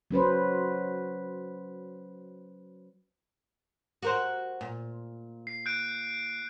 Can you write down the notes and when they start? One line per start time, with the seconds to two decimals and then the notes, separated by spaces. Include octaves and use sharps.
0.11 F#3 C#4 B4 C5
4.02 F#4 A#4 C5
4.61 A#2
5.47 C7
5.66 F#6 G6 D7